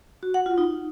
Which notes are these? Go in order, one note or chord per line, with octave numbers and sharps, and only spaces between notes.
F#4
F#5
F4
D#4